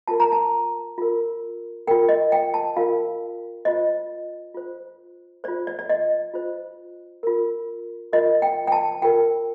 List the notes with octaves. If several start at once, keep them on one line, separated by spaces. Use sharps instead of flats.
F4 A#4 A5
A#5
A5
F4 A#4
F4 A#4 G5
D#5
G5
A5
F4 A#4 F5
F4 C5 D#5
F4 C5
F4 C5 D5
D5
D5
D#5
F4 C5
F4 A#4
F4 A#4 D#5
G5
G5
A5
F4 A#4 G5